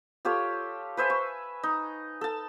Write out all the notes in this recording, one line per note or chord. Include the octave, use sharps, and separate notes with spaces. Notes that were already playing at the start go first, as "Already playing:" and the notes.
F4 G4 A4 C#5
B4 C5 E5 G#5
C#6
D#4
A4 A5